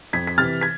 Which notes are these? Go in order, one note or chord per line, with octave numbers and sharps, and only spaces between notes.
F2 G#6 B6
B6
C3 E3 F6 A6
G#6 B6